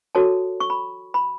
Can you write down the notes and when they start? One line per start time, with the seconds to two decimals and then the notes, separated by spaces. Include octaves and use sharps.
0.15 F#4 A4 C#5 A5
0.60 C#6
0.70 B5
1.14 B5